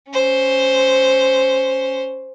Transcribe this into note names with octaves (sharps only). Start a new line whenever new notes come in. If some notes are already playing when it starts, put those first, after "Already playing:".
C#4 C5